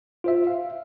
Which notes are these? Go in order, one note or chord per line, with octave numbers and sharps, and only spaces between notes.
F4 C5 E5
F5